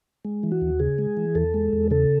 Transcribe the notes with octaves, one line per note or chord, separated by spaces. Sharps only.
G#3
E3
F#4
D#2
C#3 G#4
G#3
E3
E2 A4
G#3
E2
C#3 A4